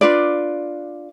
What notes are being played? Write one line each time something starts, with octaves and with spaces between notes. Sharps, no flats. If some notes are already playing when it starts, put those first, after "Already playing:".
D4 F4 B4 D5